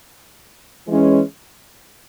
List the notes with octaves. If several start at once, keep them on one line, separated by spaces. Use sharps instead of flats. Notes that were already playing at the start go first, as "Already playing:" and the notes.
E3 G#3 C#4